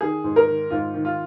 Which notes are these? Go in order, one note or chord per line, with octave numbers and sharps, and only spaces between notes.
D#3 G#4
G#2
A#4
D#3
G#2 F4
D#3
F4